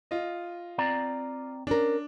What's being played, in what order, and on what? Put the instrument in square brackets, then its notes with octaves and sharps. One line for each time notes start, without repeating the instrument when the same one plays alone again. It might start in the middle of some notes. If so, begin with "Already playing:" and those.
[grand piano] F4 D#5
[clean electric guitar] C4 D5 A#5
[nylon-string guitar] C#4 A#4 [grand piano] D4